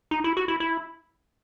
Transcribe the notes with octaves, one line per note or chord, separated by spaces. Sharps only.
D#4
E4
F#4
E4
E4